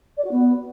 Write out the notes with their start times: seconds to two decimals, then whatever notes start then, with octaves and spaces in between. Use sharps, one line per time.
0.17 D5
0.24 F#4
0.31 B3